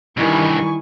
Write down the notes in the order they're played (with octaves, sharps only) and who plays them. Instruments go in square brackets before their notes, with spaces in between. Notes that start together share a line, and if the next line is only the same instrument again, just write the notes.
[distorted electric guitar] G2 C3 [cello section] D#3 E3 G3 [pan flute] E4 [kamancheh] G#5 C#6